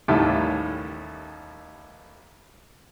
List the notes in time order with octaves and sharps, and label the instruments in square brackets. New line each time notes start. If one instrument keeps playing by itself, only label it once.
[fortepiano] A1 D#2 A2 D#3 G3 A3